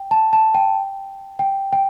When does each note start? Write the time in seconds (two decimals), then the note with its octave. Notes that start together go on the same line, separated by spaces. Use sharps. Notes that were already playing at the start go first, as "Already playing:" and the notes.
Already playing: G5
0.11 A5
0.33 A5
0.55 G5
1.39 G5
1.73 G5